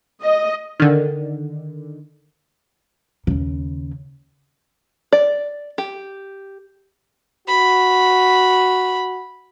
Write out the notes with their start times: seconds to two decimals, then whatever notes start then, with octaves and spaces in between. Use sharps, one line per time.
0.24 D#5
0.80 D3 D#3
3.27 D#2 C#3
5.12 D5
5.78 G4
7.48 F#4 B5